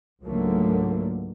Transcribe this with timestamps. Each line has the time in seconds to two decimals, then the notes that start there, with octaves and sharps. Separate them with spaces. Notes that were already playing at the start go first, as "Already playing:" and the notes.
0.25 C#2 G#2 D3 F#3 A3 A#3